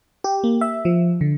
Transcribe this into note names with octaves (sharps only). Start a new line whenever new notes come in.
G4
A#3
E5
F3
D3